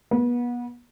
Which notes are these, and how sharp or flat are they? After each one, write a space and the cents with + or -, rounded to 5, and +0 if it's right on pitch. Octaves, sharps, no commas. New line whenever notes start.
B3 -30